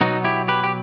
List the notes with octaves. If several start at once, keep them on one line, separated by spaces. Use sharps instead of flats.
B2 F#3 B3 D#4 F#4
E4 G4
G4 B4
G4